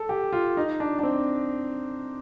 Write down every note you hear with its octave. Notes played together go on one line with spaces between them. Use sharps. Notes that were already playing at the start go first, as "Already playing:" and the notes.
Already playing: A4
G4
F4
D#4
D4
D4
C4